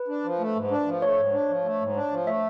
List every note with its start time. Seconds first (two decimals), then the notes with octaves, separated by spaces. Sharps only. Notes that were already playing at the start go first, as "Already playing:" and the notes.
Already playing: B4
0.08 D4
0.24 F3
0.39 A3
0.55 G#2
0.71 D4
0.86 F3
1.02 A3 C#5
1.17 G#2
1.33 D4
1.48 F3
1.65 A3
1.80 G#2
1.96 D4
2.11 F3
2.27 A3 E5